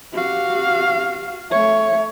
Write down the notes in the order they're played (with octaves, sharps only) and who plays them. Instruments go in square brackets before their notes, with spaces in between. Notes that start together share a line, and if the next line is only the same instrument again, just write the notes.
[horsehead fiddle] F#4 F5 [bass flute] G4
[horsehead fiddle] A3 C#5 [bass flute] E5